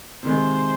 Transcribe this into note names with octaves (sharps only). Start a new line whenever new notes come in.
C3 D#3 G#3 C5